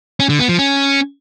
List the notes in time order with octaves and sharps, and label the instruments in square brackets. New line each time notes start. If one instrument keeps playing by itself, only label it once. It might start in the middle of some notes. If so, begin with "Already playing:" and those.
[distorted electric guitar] C#4
D3
B3
F3
C#4